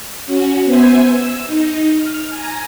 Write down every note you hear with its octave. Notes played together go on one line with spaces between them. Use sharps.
C#4 F#4
B3 C5 E5 G#5
E6
D#4
F6
G#5 A#5